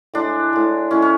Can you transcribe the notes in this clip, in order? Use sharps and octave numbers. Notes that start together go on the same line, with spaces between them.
A2 G#3 D4
A2 G#3
A2 G#3 C#4
C#4